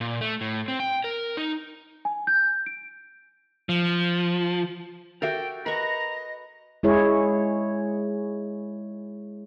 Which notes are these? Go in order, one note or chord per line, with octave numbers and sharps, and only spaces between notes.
A#2
A3
A2
C4
G5
A#4
D#4
G#5
G6
D7
F3
F#4 G4 A4 A#4 E5 G5
A#4 B4 D#5 F#5 A#5 C#6
G#3 E4 G#4 C#5